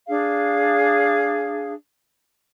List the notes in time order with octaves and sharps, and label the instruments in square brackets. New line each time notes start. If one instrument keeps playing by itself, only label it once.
[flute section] D4 G#4 F5